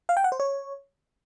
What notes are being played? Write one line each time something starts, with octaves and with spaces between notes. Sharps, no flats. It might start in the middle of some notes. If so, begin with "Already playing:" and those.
F5
G5
F#5
C5
C#5